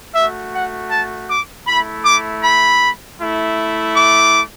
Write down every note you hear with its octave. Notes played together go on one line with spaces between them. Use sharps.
A3 F#4 E5
F#5
A5
D6
A3 E4 B5
D6
B5
A3 E4
D6